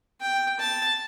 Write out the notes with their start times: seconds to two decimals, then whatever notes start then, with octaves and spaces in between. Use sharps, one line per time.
0.21 G5
0.59 A5